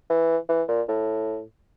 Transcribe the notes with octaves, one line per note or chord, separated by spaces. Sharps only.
E3
E3
A#2
A2